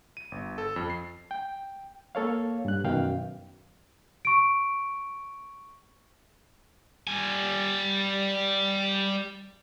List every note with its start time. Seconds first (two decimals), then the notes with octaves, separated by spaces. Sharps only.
0.17 D#7
0.32 G1
0.58 A4
0.76 F2
0.90 C7
1.31 G5
2.15 A#3 A4 C#5 F5
2.65 G2 F#6
2.84 F#2 B2 D#3 F5 G5
4.25 C#6 D7
7.07 G3 G#5